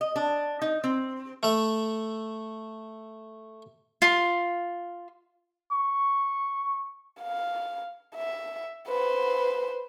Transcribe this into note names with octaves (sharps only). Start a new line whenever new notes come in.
D#5
D4
D#4
C4
A3 E5
F4 C6
C#6
F5
E5
B4 C5